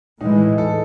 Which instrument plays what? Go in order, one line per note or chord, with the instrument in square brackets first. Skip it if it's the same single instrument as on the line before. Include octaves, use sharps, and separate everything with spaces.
[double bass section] A2 E3 G#3 [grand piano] D#4
[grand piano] A4